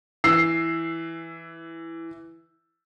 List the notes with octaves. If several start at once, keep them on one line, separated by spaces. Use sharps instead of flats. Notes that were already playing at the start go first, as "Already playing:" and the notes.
E3 E6 C7